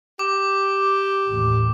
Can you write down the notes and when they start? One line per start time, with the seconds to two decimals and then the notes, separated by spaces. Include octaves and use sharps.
0.19 G4 D6
1.28 A1 D#2